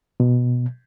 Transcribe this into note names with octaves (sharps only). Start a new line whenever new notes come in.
B2